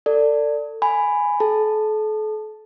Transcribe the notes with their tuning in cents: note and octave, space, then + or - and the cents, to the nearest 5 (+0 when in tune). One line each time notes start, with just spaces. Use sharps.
A4 +30 D5 +0
G#5 +0 B5 +10
A4 -40 A5 +0